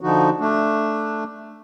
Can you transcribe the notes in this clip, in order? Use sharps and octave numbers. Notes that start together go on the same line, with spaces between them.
D3 F3 D#4 F#4
A3 D4